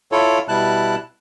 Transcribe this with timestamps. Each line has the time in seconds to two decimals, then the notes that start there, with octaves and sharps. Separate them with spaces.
0.12 E4 F4 A4 C#5
0.48 B2 G3 E4 A5 F#6